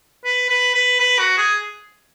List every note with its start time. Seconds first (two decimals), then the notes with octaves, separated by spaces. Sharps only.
0.25 B4
0.49 B4
0.75 B4
1.00 B4
1.19 F#4
1.37 G#4